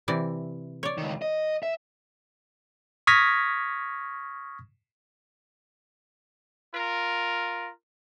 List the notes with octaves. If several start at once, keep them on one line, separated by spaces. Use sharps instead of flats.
C3 E3 D5
C#5 D5
C#2 D#3
D#5
E5
C#6 D#6 F6 G#6 A#6 B6
F4 A#4